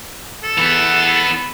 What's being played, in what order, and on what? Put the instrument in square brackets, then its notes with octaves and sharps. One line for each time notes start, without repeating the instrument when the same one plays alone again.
[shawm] A4
[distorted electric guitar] E3 B3